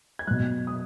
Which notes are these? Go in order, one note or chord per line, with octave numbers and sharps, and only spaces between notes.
G#6
B2 F#3 F#6
D#6